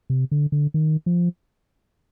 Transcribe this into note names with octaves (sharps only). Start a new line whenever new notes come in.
C3
D3
D3
D#3
F3